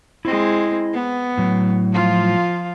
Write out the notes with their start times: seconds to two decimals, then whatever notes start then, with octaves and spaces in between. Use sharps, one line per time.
0.25 G#3 C4 E4 D#5
0.93 B3
1.38 A2 F#3
1.93 F3 F4